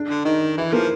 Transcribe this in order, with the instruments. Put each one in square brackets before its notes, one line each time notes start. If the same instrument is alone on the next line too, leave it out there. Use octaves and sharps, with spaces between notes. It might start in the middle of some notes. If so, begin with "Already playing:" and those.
Already playing: [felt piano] D4
[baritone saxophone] D3
[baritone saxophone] D#3 [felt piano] D#4
[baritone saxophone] E3 [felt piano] E4
[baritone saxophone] F3 [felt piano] A#3